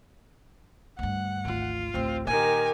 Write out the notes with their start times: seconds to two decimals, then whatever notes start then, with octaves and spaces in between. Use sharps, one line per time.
0.99 D2 G2 F#5
1.45 G#1 D2 F4
1.94 A1 D2 C4
2.27 A#2 D#3 G4 A#4 G#5